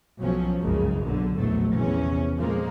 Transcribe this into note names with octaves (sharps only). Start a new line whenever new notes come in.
B1 F3 F#3 C#4
F#1 C#2 G2 C#3 G#3 A#3
B1 D3
A#1 E2 A2 F#3 A3
E2 C3 E3 C#4
F2 A#2 F3 G#3 A#3